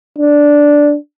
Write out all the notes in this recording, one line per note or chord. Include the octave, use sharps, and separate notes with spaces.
D4